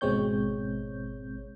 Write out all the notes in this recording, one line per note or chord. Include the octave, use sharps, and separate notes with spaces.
G#1 B2 G#3 C4 C#5 G6